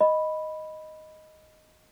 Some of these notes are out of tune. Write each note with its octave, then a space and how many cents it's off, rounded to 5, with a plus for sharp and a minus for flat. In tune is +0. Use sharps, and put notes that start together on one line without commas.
D#5 +0 B5 +0